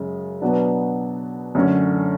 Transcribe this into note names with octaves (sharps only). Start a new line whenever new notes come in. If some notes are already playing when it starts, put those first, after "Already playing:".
Already playing: F#2 C#3 G#3
B2 F#3 B3 D4
F#2 D3 A3 C#4